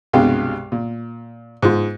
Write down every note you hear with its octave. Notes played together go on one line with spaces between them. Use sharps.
C2 G2 B2 G#3 F5 G5
A#2
G#2 F4